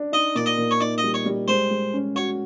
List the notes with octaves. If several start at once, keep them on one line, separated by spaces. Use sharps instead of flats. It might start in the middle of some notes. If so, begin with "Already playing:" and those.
Already playing: D4
D#4 D#5
A#2 D5
D#5
A#2
C#5
D#4 D5
D#5
G3
C#5
G3
G#3 C5
G#3
C#4
F#4 C#5